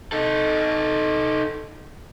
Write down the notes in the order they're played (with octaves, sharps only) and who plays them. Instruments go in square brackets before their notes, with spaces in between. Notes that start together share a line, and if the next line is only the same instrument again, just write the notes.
[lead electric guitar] D#4 A4